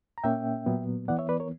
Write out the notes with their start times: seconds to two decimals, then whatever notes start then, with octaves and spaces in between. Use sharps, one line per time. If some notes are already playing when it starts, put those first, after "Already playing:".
0.18 A#5
0.24 A#2 A#3 C#4 E5 G5
0.66 A#2 F#3 B3
1.08 E3 B3 D5 F#5
1.19 C#5 E5
1.29 B4 D5
1.40 A#4 C#5